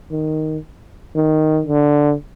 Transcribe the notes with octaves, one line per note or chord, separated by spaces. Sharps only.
D#3
D#3
D3